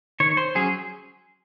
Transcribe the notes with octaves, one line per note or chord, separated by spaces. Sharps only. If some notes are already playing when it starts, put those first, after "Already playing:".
D#3 C#5
C5
F#3 C#4 G#4